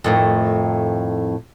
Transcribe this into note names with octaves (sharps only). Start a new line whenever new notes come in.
F2 A2 D#3